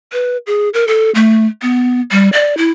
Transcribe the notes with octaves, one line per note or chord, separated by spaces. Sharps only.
B4
G#4
A#4
A4
A3
B3
G3
D5
E4